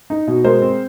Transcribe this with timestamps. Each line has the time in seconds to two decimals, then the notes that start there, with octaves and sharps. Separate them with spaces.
0.10 D#4
0.27 B2
0.44 G#3 A#4 C5
0.62 C4